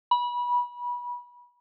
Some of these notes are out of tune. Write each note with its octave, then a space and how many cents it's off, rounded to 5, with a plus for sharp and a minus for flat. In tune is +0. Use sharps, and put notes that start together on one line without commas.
B5 -25